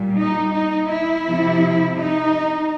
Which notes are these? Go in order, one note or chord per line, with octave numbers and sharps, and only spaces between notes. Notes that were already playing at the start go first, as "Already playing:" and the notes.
Already playing: A#2 G3
D#4
D#4
E4
C3 F3
D#4